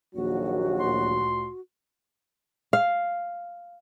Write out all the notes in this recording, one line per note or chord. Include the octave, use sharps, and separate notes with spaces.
A#1 D#2 F#3 F#4
D2 A#2 C6
F5